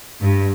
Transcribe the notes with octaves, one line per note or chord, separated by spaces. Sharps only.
G2